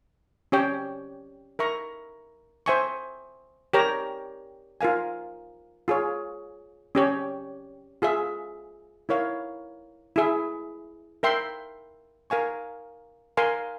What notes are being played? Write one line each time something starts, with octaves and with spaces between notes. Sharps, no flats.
C#4 G4 C#5 G5
A#4 E5 A#5 C#6
C5 E5 G#5 C#6
G4 A#4 C#5 G5 A#5
F4 A#4 F5 G#5
F4 G#4 C#5
C#4 G4 C#5
F4 G#4 E5
E4 A#4 C#5 F5
E4 G#4 E5
A#4 E5 G5 C6
A#4 F5 G#5 C#6
A#4 F5 G#5 C6